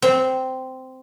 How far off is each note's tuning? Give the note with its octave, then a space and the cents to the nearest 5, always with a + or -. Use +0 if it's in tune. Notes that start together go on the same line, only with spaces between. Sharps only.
C4 -10